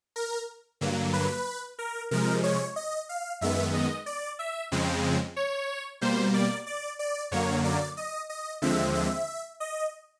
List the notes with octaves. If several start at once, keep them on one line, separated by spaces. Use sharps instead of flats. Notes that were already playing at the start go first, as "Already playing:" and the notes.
A#4
G2 D3 F#3 A#3
B4
A#4
C3 F3 G#3 A#4
C#5
D#5
F5
F#2 D#3 G#3 B3 E5
D#5
D5
E5
F2 C#3 F3 G#3 C4
C#5
B2 G3 A#3 C5
D5
D5
D5
F#2 D3 F#3 A#3 C#5
D5
D#5
D#5
D#2 D3 F3 G#3 C4 E5
E5
D#5